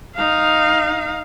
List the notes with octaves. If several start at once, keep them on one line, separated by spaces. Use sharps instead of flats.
D#4 F5